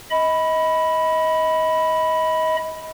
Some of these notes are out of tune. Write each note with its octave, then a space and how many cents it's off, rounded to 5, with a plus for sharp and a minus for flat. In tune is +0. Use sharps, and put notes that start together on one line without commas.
D#5 +30 B5 +0